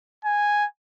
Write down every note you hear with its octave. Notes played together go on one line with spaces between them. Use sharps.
G#5